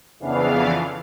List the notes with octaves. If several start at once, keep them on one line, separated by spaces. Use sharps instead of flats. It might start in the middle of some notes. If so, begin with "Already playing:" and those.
F2 C#3 E3 B3 D4 F5